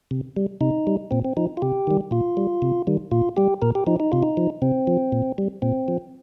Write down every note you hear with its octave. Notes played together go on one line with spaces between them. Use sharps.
C3
G3
C3 D#4
G3
A#2 C4
C4
F3 D#4
F4
C3 G4
D#3 G3
A#2 F4
G3
C3
D#3 G3
A#2 F4
G3 G4
A#2 A#4
G4
F3 D#4
D#4
C3 F4
D#4
F3
C3 C4
F3
A#2
G3
A#2 C4
F3